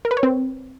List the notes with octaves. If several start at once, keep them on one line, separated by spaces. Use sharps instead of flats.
A#4
B4
C#5
C4